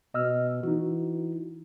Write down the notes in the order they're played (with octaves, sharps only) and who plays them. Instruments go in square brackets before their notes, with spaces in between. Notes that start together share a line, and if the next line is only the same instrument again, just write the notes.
[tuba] B2 [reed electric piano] D#5 E6 F6
[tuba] E3 [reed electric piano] D#4 F#4